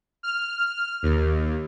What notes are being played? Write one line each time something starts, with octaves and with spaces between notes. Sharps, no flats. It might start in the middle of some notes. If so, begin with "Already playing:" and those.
F6
D#2